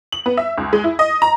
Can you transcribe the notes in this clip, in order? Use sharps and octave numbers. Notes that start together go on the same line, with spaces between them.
F#7
B3
E5
C#2
G#3
E4
D#5
A#5